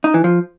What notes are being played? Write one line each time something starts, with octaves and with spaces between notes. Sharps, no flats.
D#4
E3
F3